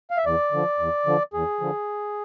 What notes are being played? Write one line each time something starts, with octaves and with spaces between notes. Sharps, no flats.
F5
E5
E2 D5
D3 F3
E2
D3 F3
E2 G#4
D3 F3